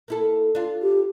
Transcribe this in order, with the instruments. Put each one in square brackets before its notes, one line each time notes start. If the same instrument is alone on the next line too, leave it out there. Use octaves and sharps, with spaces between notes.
[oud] A#3 E4 A4
D4 F4
[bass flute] G4